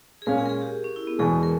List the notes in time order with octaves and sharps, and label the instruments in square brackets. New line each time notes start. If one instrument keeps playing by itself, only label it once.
[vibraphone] G#4
[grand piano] A#2 G#3 C#4 [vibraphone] A#4
[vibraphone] G#4
A#4
G#4
G4
C#4
E4
B3
[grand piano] E2 B2 G#3 [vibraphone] G#4
[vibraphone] A#4